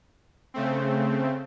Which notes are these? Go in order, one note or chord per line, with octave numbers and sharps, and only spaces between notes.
C#3 A3 C4